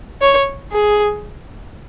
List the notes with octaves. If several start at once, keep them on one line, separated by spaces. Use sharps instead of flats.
C#5
G#4